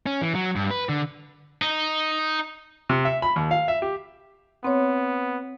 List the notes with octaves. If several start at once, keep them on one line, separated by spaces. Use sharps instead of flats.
C#4
E3
F#3
G2
B4
D3
D#4
C3
E5
B5
D#2
F5
E5
G4
B3 C4 C#5